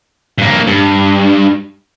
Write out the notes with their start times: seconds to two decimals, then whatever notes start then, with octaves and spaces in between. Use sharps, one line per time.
0.38 G2 A#3
0.67 G2